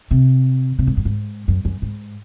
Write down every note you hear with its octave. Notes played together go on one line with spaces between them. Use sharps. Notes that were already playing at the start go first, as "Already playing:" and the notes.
C3
C3
G#2
F#2
G#2
F#2
F#2
G#2